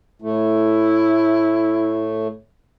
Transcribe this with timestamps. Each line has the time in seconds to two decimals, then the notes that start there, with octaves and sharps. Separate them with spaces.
0.22 A2 A3 E4